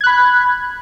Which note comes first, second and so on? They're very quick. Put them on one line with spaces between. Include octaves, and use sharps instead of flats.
G#6 F#6 B5